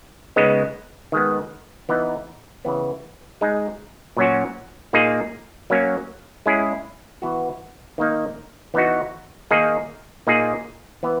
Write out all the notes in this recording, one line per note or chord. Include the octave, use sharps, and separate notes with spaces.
C#3 G#3 B3 D#4
D#3 G#3 B3
E3 B3 D#4
C#3 E3 B3
G#3 D#4 G#4
A#2 F#3 C#4 F#4
A#2 A#3 D#4 G#4
F#3 A#3 C#4
G#3 C#4 E4 G#4
E3 B3 F#4
D#3 A#3 D#4
E3 B3 D#4 F#4
D#3 A#3 D#4 G#4
A#2 A#3 D#4 G#4
E3 B3